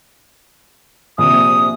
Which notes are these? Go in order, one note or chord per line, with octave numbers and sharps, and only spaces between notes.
A#1 C3 D#6